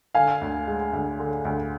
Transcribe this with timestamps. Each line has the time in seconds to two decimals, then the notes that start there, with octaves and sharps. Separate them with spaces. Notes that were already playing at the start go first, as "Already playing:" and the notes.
0.15 D3 F5 G#5
0.41 D2
0.67 G#3
0.93 D2
1.19 D3
1.45 D2